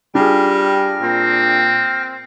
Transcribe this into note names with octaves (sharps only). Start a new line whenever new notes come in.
G3 D4 F4 G#4 G5 F6 A#6
A#2 C4